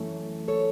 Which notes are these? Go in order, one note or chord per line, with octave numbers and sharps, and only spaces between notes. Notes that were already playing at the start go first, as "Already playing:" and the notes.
Already playing: F#2 E3 A3 C#4
A4 C#5